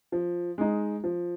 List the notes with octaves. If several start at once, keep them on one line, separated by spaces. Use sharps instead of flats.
F3
G#3 D#4
F3